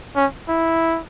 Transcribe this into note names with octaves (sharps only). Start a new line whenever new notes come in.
C#4
E4